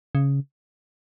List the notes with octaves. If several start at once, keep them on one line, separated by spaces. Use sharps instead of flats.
C#3